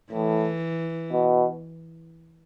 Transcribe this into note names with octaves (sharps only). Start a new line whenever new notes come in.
A2 E3
B2